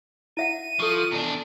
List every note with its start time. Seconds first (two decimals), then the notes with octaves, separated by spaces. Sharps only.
0.37 E4 E5 F#5 D#7
0.80 F3 A4 C#6
1.12 E2 D4